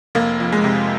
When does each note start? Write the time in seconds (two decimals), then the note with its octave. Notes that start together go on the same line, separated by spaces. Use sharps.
0.15 F1 A#3
0.40 F2
0.52 G#3
0.64 C3